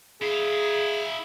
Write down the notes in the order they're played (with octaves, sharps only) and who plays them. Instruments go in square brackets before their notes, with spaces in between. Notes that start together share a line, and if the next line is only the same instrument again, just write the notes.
[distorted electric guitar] E4 F5 [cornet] G#4